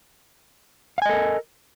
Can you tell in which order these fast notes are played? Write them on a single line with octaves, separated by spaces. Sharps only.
F5 G#5 D#5 A4 A#4